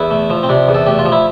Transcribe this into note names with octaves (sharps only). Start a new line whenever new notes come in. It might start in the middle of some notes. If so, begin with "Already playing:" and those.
Already playing: E2 E4
A3
F3
C4
C3 D4
E2
A4
A3 G4
F4
F3
E4